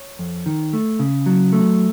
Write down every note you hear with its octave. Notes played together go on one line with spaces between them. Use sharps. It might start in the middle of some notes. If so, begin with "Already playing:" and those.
Already playing: C#5
F2
D#3
A3
C#3
F#3
A3